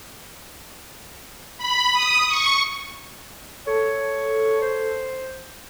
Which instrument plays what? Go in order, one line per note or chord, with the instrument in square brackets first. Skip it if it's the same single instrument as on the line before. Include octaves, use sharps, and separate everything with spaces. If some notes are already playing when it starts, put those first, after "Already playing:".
[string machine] B5
D#6
C#6
[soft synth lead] A4 [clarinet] C#5
[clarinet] C5